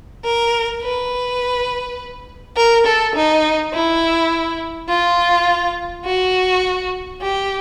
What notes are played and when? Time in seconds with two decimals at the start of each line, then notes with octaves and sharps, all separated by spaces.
0.24 A#4
0.82 B4
2.57 A#4
2.86 A4
3.15 D#4
3.73 E4
4.89 F4
6.05 F#4
7.22 G4